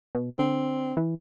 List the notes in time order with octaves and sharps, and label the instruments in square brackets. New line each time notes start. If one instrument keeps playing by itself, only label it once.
[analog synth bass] B2
[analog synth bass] D3 [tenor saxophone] C4
[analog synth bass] E3